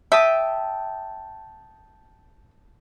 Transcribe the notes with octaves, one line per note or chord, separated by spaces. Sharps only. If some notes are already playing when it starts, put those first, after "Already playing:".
E5 G5 A5 D#6